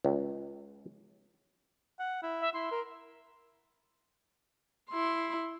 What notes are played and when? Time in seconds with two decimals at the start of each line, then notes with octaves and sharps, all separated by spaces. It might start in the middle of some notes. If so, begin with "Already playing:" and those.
0.05 C#2
1.99 F#5
2.23 E4
2.41 E5
2.54 E4 C6
2.71 A#4
4.90 E4 C6